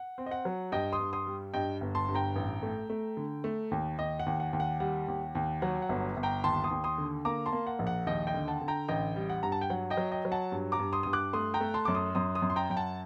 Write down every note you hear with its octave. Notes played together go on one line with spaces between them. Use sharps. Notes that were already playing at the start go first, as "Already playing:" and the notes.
Already playing: F#5
C4
D#5
F#5
F#3
G2 D#5 G5
C6 D#6
G2
C6 D#6
G3
G2 D#5 G5
G1
A5 C6
G2
G5 A#5
A1
A3
A3
D3
A3
D#2
D#2 D#5
F#5
D#2
F#5
D#2
F#5
G3 F#5
D#2
D#2
F#3 F#5
F#5
G1
G1
G5 A#5
D#2 A5 C6
C6 D#6
D#2
C6 D#6
D3
A#3 A#5 D6
A5 C6
A#3
F#5
A#1
F#5
D#2 D#5 G5
D#5 G5
D3
F#5 A5
D3
G5 A#5
A1 D#5 G5
G3
F#5
G2 A#5
A5
G5
F#3 F#5
D#5 G5
F#3
D#5 G5
F#3
F#5 A5
G2
A#5 D6
G2
C6 D#6
G2 D#6
D6 F#6
A3 C6 D#6
G5 A#5
A3
A5 C6
F#2 D6
C6 D#6
F#2 C6 D#6
C6 D#6
F#2
C6
G5 A#5
F#2 G5
F#5 A5